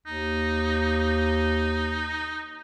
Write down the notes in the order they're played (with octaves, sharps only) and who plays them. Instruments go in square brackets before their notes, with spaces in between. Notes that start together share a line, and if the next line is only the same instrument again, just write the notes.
[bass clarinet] D#2 [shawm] D#4